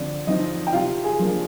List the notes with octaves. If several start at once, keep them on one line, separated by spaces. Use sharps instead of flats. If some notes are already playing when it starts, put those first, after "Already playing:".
Already playing: D3 F3 C4 D5
F3 C4 D#4 D#5
G5
C3 F4 F5
G#4 G#5
F3 A#3 D4